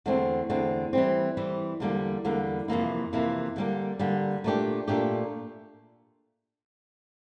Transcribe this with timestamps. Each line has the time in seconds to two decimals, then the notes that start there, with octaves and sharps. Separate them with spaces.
0.06 E2 D3 A3 C4
0.50 E2 D3 A3 C4
0.93 E3 G3 C4
1.37 E3 G3 C4
1.80 E2 D3 G3 A#3
2.25 E2 D3 G3 A#3
2.68 F2 C3 E3 A#3 E4
3.13 F2 C3 E3 A#3 E4
3.56 D3 G3 A#3
3.99 D3 G3 A#3
4.44 A#2 A3 D4 G4
4.88 A#2 A3 D4 G4